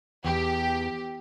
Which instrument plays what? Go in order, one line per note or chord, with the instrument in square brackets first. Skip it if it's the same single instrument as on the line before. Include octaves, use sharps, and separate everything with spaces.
[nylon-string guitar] E2 [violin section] G4